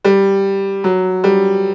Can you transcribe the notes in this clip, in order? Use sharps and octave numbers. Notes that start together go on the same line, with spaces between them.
G3
F#3
G3